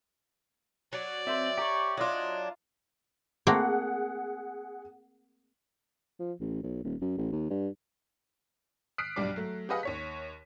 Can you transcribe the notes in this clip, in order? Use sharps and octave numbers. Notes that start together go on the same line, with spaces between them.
F#3 D5
C4 C5 E5
G4 C#5 A#5
F#3 D4 F4 D#5 D6
A3 A#3 C4 G#4 F#5
F3
A1
B1
D#1
F#2
A1
D#2
G2
D#6 F6 F#6 B6 C7 D7
B1 G2 G3 D5 D6
F#3 A3
G4 G#4 B4 D#5 F5 F#5
D#2 C#5 B6